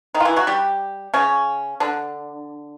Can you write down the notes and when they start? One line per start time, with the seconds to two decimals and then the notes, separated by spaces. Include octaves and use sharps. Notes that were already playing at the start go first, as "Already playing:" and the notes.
0.14 D#3 D#4
0.20 F4
0.25 E3 E4
0.36 F#3 F#4
0.47 G3 G4
1.14 C#3 C#4
1.80 D3 D4